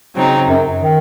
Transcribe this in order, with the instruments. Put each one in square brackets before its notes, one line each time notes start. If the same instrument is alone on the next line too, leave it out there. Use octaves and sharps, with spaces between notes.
[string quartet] C#3 F#3 C4 D#4
[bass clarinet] F#2
D#3